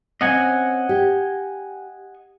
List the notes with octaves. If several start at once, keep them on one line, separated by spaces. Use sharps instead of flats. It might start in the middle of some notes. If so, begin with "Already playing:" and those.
C4 C#4 D#5 F#5 G#5
G4